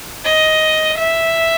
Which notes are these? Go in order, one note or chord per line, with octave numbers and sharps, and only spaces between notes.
D#5
E5